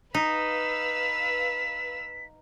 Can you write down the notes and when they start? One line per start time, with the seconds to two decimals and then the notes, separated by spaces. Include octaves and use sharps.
0.14 D#4 B4 F5 E6 B6